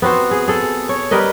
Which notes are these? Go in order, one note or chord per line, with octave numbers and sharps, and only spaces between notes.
B3 C4 F#4 C5
G#4
G#4 A4
C#5
G3 A#4 B4 D#5